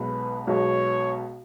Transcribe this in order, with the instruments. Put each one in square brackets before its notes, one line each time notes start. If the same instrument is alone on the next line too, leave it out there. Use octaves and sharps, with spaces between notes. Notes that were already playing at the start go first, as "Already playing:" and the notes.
Already playing: [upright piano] B1 B2 G#3 [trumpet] B4
[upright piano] B1 B2 G#3 [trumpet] C#5